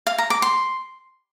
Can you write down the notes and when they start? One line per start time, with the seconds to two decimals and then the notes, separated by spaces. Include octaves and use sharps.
0.07 F5
0.18 A#5
0.30 D6
0.42 C6